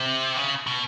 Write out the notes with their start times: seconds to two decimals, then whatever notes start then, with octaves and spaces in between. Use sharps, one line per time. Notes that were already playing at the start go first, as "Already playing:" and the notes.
Already playing: C3
0.37 C#3
0.67 B2